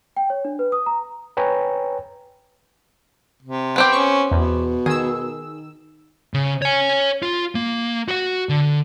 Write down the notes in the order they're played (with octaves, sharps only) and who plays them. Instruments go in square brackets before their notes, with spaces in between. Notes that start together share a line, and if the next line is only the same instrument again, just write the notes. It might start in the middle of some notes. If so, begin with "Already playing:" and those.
[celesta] G5
C#5
D4
B4
D#6
A#5
[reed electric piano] B4 C#5 G5 G#5 A#5
[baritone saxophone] C3
[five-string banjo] B3 C4 G4
[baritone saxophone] C#4 [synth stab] C#6
[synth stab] E2 [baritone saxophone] B2
[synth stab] D#3 E6 [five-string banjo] G#4
[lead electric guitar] C#3
C#5 G#5
F4
A#3
F#4 F#5
D3